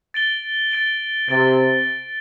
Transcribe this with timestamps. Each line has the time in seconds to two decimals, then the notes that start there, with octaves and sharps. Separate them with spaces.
0.14 A6 D7 G7
0.72 A6 D7 G7
1.29 C3 A6 D7 G7